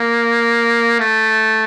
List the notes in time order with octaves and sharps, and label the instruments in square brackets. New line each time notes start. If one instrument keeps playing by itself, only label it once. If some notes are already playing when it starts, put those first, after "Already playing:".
Already playing: [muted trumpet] A#3
A3